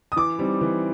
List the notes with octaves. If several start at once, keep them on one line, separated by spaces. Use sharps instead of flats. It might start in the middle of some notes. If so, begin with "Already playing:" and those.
D#6
E3 D6
G3 C4 D#4
E3